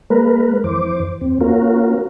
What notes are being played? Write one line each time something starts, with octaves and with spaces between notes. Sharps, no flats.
G#3 A#3 A#4 B4
F2 E3 C5 D6
E2 C4
A#3 C#4 F4 F#4 A#4